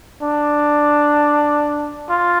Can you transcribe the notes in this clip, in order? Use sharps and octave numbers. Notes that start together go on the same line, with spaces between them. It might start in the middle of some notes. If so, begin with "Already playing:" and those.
D4
F4